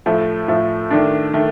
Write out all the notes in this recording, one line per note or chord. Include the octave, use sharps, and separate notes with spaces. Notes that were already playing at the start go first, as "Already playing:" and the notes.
A2 F3 A3
A2 F3 A3
D#3 A3 D4
D#3 A3